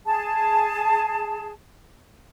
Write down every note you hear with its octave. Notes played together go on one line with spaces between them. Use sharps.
G#4 A5